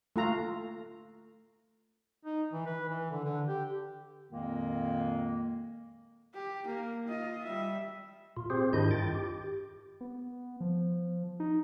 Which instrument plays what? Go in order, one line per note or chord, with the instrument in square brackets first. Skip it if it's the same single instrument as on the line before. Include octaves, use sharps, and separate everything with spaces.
[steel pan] A3 F4 A#5
[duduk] D#4
E3
B4
E3
D3
D3
G4
[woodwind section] F2 A#2 D#3 G#3 A#3
[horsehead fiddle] G4
A#3
F4 D#5
G3 E5
[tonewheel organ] A#2 F4
C4 F4 G4 G#4 C5
G#2 D#3 D4 E4 D#5 G6
G2 F4 G5 A6
G4
[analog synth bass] B3
F3
D#4